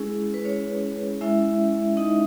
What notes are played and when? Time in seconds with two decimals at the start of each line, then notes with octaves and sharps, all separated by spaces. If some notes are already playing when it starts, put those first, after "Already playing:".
Already playing: G#3 C#4 E4 G#4
0.34 B4
0.45 C#4 C#5
1.21 G#3 C#4 E4 E5
1.97 D#4 D#5